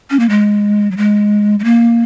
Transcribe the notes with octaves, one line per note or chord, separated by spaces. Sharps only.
C#4
A#3
G#3
F#3
G#3
G#3
A#3